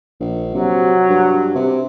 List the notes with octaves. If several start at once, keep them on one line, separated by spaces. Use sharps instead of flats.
A#1
C3 F#3
G2
C3